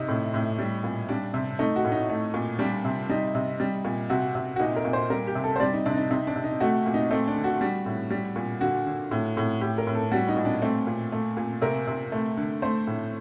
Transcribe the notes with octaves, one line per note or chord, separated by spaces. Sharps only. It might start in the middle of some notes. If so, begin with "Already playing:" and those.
Already playing: C3 D#4
A2
A2
G3
A#2
G3 D4
C3
A3 D#4
F#4
A2
D#4
A3
A#2
G3 D4
C3
G3 D#4
C3
G3
A#2
C3 F#4
C3
F#4
A#2 D#4
A#4
A#2
C5
G3 A#4
G4
C3
A4
C5
G3 D5
D#4
C3 D4
D#4
D4
C3 D#4
D4
C3
D#4
A3 F#4
A#2
D#4
A3 C4
D4
D3
F#4
G3
A2
G3
A#2
D3 F#4
D3
A2
A2
A2 G4
A#4
A2
A4
G3 F#4
D#4
A#2
D4
A3 C4
A#2
A3
A#2
C3 A#4
C3
A3
D3
A3 C5
A2